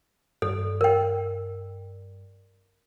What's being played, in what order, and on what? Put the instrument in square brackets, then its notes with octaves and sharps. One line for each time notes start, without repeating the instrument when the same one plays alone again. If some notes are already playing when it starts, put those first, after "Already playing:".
[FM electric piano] G2 [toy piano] A4
[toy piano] A#4 G5